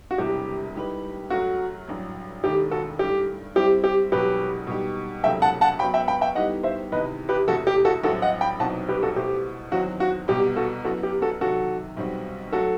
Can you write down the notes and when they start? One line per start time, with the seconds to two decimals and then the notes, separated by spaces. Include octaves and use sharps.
0.11 F#4
0.18 E1 E2 C3 E3 G3 G4
0.75 A2 G3 D#4 G4 B4
1.30 F#2 F#3 A3 F#4
1.88 A1 G2 F#3
2.43 E1 D#2 D#3 A3 G4
2.71 F#4 A4
2.99 G2 E3 A3 G4
3.55 A2 G3 C4 E4 G4
3.84 G4
4.12 E1 E2 B2 F#3 G4 B4
4.67 B2 G3 D#4 G4
5.23 E1 E2 C3 F#3 A3 E5 G5
5.42 F#5 A5
5.61 F#5 A5
5.79 F#2 F#3 B3 F#4 B4 G5 B5
5.94 E5 G5
6.08 G5 B5
6.21 E5 G5
6.35 A2 G3 B3 D#4 G4 D#5 F#5
6.63 C5 E5
6.92 E2 C3 D#3 B4 D#5
7.29 G4 B4
7.47 E1 E2 C3 E3 A3 F#4 A4
7.67 G4
7.85 F#4 A4
8.04 A1 G2 F#3 C4 E4 F#4 A4
8.22 D#5 F#5
8.41 G5 B5
8.60 C2 B2 F#3 C4 D#4 F#5 A5
8.89 G4 B4
9.03 F#4 A4
9.16 B2 A3 E4 G4 A4 C5
9.72 E2 D#3 F#3 C4 D#4 F#4
10.00 F#4
10.28 C2 B2 G3 B3 G4
10.56 F#4 A4
10.84 F#2 E3 B3 F#4 A4
11.03 G4
11.22 F#4 A4
11.41 C3 D#3 F#3 F#4 A4
11.97 B1 B2 G3 C4 F#4
12.52 F#3 A3 F#4 A4